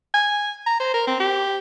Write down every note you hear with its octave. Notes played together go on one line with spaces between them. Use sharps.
G#5
A#5
C5
A#4
C4
G4